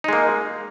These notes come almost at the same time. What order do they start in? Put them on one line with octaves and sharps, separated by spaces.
D#4 G#3 A#3